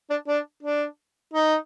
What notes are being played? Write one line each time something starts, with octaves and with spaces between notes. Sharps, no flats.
D4
D4
D4
D#4